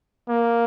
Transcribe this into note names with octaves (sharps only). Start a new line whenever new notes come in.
A#3